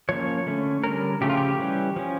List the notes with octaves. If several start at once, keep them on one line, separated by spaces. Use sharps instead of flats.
F3 A#3 C#4 C#5
D3 A3 C#4
D3 G3 C#4 A#4
C#3 F3 A3 C#4 G4
F4
G4
E3 G3 C#4
F3 C#4